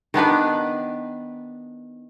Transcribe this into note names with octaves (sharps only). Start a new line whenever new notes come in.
D#3 B3 D4 B4